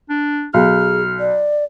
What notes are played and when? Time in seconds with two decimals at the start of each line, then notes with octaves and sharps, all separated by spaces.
0.10 D4
0.54 B1 G#4 F6
1.20 D5